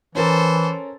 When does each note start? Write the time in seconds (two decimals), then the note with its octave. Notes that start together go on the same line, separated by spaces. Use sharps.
0.15 E3 C#4 A4 A#4 C5 A6